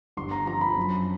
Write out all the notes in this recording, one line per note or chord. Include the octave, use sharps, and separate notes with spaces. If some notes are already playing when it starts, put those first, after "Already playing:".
G1 C6
A#5
F3 A#5
B5
F#2